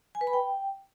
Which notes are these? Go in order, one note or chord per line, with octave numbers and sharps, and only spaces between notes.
G#5
B4
B5
G5